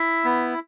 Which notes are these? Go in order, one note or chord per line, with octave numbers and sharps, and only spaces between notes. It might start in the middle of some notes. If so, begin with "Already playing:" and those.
Already playing: E4 E5
B3